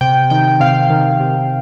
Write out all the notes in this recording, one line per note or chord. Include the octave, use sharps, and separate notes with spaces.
C3 G5
D#3 G5
C3 F5
D#3
C3